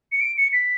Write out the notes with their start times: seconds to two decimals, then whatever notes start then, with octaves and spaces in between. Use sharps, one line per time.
0.12 C#7
0.21 D7
0.37 C#7
0.53 B6